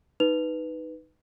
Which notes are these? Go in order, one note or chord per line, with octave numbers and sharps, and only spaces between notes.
D#4 B4 F7